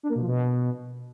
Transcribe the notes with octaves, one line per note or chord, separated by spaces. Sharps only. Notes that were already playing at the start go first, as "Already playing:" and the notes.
D4
A#3
B2
F3
B2